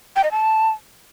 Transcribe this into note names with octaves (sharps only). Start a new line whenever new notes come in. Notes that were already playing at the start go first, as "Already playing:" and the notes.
G5
D#5
A5